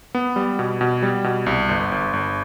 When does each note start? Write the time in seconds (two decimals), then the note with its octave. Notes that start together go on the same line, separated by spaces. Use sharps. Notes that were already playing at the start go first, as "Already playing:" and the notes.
0.15 B3
0.36 G3
0.59 B2
0.81 B2
1.03 G3
1.24 B2
1.46 C2
1.69 G1
1.92 G1
2.13 G1